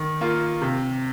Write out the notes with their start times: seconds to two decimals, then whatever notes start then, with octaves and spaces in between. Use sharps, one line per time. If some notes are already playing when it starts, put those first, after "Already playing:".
Already playing: D#3
0.21 A#3 F4
0.62 C3